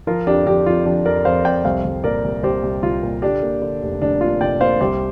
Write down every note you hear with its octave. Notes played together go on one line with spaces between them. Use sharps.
F3 F4 A#4
F2 D4 G4
F3 D4 G4
F2 F4
F3 D4 G4
F2 A#4 D5
F2 C5 F5
F2 D5 G5
C2 C5 F5
C2
A#2 A#4 D5
C2
C2 G4 C5
C2
C2 F4
A#2
D3 D4 G4
A#3
D3
F1
F1 D4
A#3 F4
F1 D5 G5
A#3 C5 F5
C2 G4 C5